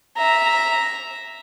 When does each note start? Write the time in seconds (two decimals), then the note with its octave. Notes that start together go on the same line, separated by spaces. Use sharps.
0.17 E5 A#5